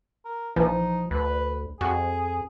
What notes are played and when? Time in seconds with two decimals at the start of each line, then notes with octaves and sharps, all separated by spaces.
0.25 A#4
0.56 A#1 E3 F3 D#4
1.11 D2 B4
1.81 F2 F#4 G#4